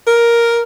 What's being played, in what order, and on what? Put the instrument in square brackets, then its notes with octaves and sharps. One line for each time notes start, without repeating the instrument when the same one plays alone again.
[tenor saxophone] A#4